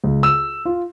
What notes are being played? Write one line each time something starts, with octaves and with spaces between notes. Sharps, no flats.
C#2
E6
F4